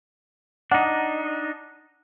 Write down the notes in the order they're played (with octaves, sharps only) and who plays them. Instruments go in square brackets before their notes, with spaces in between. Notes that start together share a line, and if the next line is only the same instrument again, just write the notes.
[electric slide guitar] D4 D#4 [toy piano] F#5